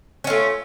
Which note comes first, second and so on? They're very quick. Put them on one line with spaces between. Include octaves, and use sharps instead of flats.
C#4 F4 A3